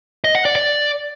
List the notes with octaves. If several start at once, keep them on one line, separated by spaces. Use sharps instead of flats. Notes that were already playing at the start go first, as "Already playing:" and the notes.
D#5
F#5
D5
D5